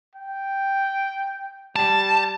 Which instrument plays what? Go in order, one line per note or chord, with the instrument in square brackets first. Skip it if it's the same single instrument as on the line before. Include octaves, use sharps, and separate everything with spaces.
[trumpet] G5
[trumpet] G3 [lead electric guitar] A5